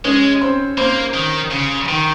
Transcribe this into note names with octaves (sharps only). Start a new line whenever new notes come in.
G#3 C#4 C#5
C4 C5
A#3 C4 C5
D#3
C#3
D#3